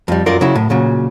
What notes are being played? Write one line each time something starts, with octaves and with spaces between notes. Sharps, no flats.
F2 G3
F#2 F4 A#4 D5
C#3 F#3 E4
A2
A#2 C#3 F#3